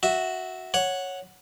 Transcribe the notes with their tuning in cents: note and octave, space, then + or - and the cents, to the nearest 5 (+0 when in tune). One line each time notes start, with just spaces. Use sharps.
F#4 +0 E5 -10
C#5 +0 F#5 -5